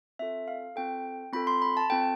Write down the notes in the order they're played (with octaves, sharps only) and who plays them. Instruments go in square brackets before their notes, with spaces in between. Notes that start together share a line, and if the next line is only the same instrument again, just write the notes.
[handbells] C4 F4 A4 E5
F5
C4 F4 A4 G5
C4 F4 A4 B5
C6
B5
A5
C4 F4 A4 G5